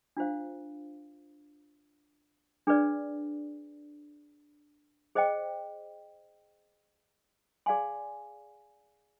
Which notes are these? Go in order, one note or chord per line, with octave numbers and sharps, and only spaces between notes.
D4 F4 C5 F5
D4 G#4 B4 D5
G#4 C5 D#5 G5
G#4 D5 F5 G#5 C6